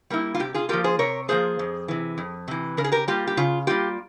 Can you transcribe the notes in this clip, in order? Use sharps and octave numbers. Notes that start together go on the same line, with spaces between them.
G3 A#3 E4
F4
C3 G4
F4 G#4
F3 A#3 F4 G4 A#4
G#4 C5
C3 A#4 C#5
F3 A#3 F4 G#4 C5
F2
C3 E3
F2
C3 E3
C#3 A#4
G#4
G4 A#4
G3 A#3 F4 G4
G4
C#3 F4
G3 A#3 F4 G4